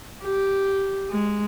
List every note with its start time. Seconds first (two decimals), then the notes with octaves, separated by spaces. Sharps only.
0.23 G4
1.11 G#3